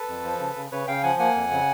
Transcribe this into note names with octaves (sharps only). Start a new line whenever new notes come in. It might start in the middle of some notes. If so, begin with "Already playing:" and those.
Already playing: A4 B4
F2
F3
C#3
C#3
C#3 B4 C#5
C#3 F5 G5
F3 F#5 G#5
A#3 F#5 G#5
F2
C#3